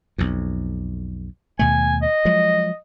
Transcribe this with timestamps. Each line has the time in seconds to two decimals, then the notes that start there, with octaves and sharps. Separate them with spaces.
0.18 B1 F2
1.59 D#2 B2 A3 G#5
2.02 D#5
2.25 F3 F#3 G#3